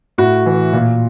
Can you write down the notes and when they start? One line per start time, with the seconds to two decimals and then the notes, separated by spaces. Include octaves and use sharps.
0.18 A2 F#4
0.46 E3
0.73 A#2